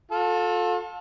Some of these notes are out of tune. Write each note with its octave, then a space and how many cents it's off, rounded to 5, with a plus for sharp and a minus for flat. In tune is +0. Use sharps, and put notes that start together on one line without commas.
F4 +35 A4 +0